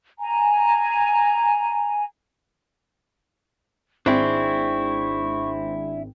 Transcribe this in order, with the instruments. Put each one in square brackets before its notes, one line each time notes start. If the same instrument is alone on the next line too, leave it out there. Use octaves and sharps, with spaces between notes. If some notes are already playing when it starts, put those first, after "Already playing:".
[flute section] G#5 A#5
[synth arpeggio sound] G#1 [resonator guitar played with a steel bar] C4 [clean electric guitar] D4 E4 G#4 [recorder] C#6